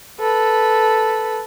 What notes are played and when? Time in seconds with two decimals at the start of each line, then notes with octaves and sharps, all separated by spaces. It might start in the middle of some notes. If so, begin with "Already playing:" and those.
0.20 A4 B4